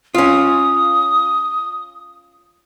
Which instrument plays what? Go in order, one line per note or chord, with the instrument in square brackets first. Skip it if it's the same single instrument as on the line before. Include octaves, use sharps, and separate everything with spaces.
[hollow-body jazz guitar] C#4 F4 [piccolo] D#6